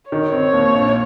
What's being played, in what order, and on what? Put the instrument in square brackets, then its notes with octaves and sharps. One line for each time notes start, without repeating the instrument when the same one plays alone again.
[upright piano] D#3 [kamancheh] C#5
[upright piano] C4
D#2
A#1